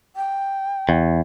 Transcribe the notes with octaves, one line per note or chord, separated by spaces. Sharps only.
G5
E2